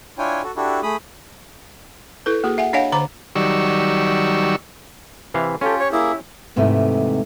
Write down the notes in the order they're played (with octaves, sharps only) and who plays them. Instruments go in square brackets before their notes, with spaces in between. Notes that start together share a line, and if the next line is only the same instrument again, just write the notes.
[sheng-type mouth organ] D4 E4 F4 C#5 G5 G#5
F#4 A4
D4 E4 F#4 G4 A4
A3 G#4 B5 D#6
[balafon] E4 A4 B4
A#3 F#4 G#4
E5 F#5 G#5
D4 C#5 D#5 F5 F#5 G#5
D3 C5 A#5 D6
[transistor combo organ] D#3 F#3 G3 D5 C#6 E6
[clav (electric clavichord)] C3 E3 F5
[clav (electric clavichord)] C#4 G4 [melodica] F4 [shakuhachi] A4
[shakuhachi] C#5
[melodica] A#3 G#4 [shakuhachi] E4
[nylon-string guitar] D#2 G#2 C3 E3 A3